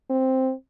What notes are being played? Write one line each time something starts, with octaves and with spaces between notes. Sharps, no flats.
C4